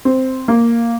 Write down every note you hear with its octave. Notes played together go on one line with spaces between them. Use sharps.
C4
A#3